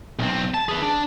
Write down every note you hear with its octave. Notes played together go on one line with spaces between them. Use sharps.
B1 C4
A5
G#4 B4
D4